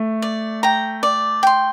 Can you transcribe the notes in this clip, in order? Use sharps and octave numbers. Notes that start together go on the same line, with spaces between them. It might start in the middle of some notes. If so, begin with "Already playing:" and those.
Already playing: A3
D5
G5 A#5
D5
G5 C6